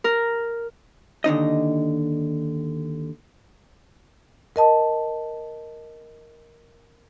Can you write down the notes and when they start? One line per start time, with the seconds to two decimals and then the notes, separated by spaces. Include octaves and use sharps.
0.04 A#4
1.24 D#2 D3 D#4 D#5
4.56 A#4 D#5 A5